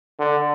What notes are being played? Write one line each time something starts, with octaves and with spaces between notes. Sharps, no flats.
D3